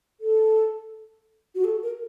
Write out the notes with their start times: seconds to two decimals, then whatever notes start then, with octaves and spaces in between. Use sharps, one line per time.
0.21 A4
1.55 F#4
1.64 A4
1.83 A#4